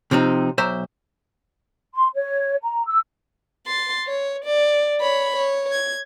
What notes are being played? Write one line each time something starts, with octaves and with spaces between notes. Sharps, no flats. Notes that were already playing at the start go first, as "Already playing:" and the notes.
C3 F3 C4 D#4
B1 C5 E5 A#5
C6
C#5
A#5
E6
C6 A6
C#5
D5
C#5 B5
C#5
G#6